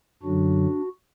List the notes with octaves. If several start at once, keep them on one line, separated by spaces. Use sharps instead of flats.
F#2 D3 F#3 D4 F#4